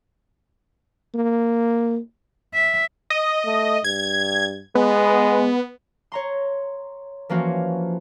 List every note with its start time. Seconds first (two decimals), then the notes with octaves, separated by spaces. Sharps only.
1.14 A#3
2.54 E5
3.10 D#5
3.44 A3
3.84 G2 G#6
4.75 G#3 B3
6.12 C#5 A#5 C6
7.29 E3 F3 A#3 C#4 F4 F#4